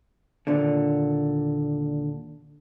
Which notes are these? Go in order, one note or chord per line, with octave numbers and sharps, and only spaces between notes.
D#2 A#2 D3